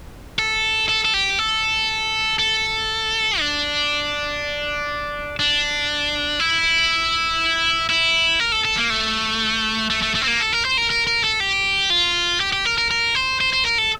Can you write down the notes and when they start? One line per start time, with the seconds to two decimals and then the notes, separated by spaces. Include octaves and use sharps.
0.39 A4
0.89 A4
1.05 A4
1.14 G4
1.39 A4
2.39 A4
3.39 D4
5.39 D4
6.40 E4
7.90 E4
8.40 A#4
8.52 A4
8.65 A4
8.77 A#3
8.90 A3
9.90 A3
10.02 A3
10.15 A3
10.22 C4
10.27 A#3
10.40 A4
10.53 A#4
10.65 C5
10.77 A#4
10.90 A#4
11.07 A#4
11.24 A4
11.40 G4
11.90 F4
12.40 G4
12.53 G4
12.65 A#4
12.78 A#4
12.91 A#4
13.15 C5
13.41 C5
13.53 C5
13.65 A#4
13.78 A4